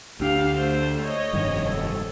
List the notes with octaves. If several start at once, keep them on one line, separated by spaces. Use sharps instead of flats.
D2 D4 G4 F5
A3 C5
C#5 D#5
F1 G2 D#3
A4